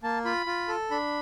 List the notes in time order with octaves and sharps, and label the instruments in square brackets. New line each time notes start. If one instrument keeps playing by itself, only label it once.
[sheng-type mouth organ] A#3 A5
F4 B5
F4
A4
D4 B5